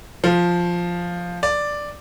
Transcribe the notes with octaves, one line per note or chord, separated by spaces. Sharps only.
F3
D5